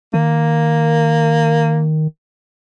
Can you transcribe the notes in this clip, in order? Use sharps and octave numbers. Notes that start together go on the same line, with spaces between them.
D#3 A#3